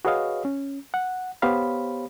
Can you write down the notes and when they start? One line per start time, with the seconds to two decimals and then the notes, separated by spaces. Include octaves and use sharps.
0.05 F#4 G#4 B4 C#5 D#5 F5
0.45 C#4
0.94 F#5
1.42 B3 G4 C5 C#5 F5 B5